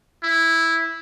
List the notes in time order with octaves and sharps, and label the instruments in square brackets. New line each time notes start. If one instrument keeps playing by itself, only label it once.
[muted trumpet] E4